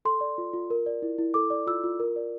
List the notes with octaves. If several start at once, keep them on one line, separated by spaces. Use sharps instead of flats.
A4 C6
D5
F4
F4
A#4
D5
E4
E4
A4 D6
D5
F4 E6
F4
A#4
D5